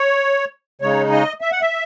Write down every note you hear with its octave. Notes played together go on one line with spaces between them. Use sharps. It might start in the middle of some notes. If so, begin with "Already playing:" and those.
Already playing: C#5
C#3 G#3 D#4 C#5
D#5
E5
F#5
E5